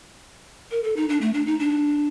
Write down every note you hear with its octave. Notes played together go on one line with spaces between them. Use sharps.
A#4
A4
D#4
D4
A3
D4
D#4
D4